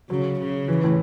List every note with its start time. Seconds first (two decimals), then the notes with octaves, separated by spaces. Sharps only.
0.09 C#3 F#3
0.40 C#3
0.68 E3
0.84 A2